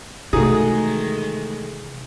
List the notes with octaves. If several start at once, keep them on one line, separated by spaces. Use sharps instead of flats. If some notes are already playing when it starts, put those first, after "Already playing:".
C3 D#3 E3 G#3 A3 D#4 F#4 G#4